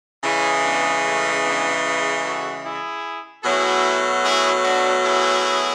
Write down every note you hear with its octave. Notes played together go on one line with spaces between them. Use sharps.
C#3 E3 G#3 C#4 E4
B3 D4
A3 C#4
B3 D4
G#4 B4
F#4 A4
E4 G#4
B2 F#3 A3 E4 G#4
E4 G#4
D4 F#4
E4 G#4